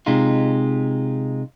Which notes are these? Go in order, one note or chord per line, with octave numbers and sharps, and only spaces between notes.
C3 G#3 D#4 F4